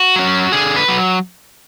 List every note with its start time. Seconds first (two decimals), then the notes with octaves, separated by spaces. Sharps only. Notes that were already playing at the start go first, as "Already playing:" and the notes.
Already playing: F#4
0.16 F#3 C#4
0.52 D3 G#4
0.76 B4
0.88 F#3